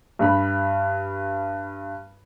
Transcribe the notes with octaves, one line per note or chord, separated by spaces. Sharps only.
G2 G3 B5